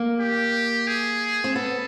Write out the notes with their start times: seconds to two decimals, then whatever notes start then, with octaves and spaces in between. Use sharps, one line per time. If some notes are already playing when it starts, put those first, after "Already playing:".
Already playing: A#3
0.20 G4
0.88 G#4
1.44 C4
1.55 B3 A4